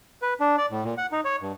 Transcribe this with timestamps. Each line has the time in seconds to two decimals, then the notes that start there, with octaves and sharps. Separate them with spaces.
0.22 B4
0.40 D4
0.58 D5
0.70 A2
0.84 A#2
0.98 F#5
1.12 D#4
1.25 C#5
1.42 G2